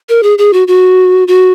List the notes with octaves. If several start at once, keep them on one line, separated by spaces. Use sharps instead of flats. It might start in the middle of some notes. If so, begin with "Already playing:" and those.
A#4
G#4
G#4
F#4
F#4
F#4